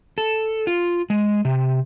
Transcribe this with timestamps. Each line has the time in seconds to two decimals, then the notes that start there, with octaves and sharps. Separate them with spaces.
0.18 A4
0.67 F4
1.10 G#3
1.45 C3